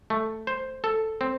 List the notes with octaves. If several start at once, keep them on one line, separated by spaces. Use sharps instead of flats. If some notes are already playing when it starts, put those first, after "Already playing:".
A3
C5
A4
C4